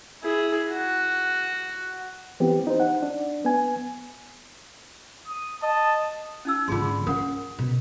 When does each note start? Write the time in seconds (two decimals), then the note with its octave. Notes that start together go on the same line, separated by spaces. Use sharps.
0.23 E4 G#4
0.72 F#4
2.40 E3 B3 C4 G4
2.67 D#4 C5
2.80 F#5
3.03 D4
3.45 B3 G#5
5.28 D#6
5.63 D#5 A5
6.45 C#4 D#4 E6
6.68 G#2 D3 F4 G#4 C6
7.07 C#4 A#4 F#5
7.59 B2